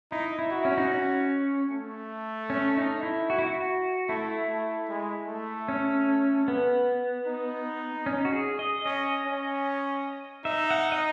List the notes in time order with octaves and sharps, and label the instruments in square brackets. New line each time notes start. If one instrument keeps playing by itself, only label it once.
[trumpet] D#4 [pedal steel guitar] E4
[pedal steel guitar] E4
[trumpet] F#4
[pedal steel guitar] C#4
D#4
C#4
[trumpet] A3
[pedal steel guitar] C#4
D#4
E4
F#4
E4
F#4
[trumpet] A3 [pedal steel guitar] E4
[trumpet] A3
G#3
A3
[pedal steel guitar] C#4
B3
[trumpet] D#4
[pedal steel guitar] C#4
F#4
G#4
D#5
[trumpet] C#4 [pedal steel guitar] D#5
[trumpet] C#4
[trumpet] D#4 [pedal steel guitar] E5
[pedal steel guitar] F#5
D#5